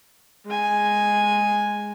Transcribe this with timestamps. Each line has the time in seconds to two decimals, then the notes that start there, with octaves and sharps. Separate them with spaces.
0.46 G#3 G#5